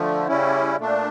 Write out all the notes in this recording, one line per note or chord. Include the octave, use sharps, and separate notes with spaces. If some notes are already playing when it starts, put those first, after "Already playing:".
Already playing: D3 F3 A3
C#3 G3 C#4 E4
A#2 A3 D4